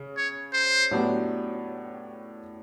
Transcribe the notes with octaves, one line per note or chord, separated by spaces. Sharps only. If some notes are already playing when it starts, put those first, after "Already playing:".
Already playing: C#3
C#5
C5
A2 F#3 B3 D4 G4